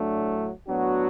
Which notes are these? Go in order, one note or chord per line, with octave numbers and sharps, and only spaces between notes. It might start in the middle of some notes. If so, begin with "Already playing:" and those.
Already playing: A2 F#3 A3 D4
A2 F#3 B3 D4 F#4